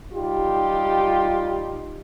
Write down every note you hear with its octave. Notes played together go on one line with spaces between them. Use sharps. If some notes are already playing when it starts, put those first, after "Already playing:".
G3 D#4 F4 G4